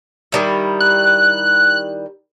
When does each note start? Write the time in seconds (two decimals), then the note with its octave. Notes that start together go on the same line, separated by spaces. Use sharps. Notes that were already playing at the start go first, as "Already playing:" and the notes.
0.32 D#3 G3 E4
0.80 F#6